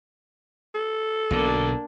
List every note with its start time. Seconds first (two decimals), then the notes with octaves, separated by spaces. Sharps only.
0.75 A4
1.31 B1 B2 D3 A#3 D4